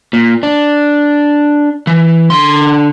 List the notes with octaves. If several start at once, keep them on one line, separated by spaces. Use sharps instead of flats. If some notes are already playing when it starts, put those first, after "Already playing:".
A#2
D4
E3
D3 C6